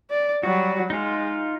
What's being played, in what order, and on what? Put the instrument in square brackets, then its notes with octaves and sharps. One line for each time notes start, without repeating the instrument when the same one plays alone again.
[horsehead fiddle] D5
[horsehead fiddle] F#3 G3 [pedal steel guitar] F#4
[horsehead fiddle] G#3 [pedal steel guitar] D#4 F4